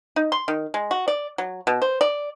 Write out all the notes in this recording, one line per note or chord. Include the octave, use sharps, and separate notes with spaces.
D#4
C6
D#3
G#3
F#4
D5
F#3
B2
C5
D5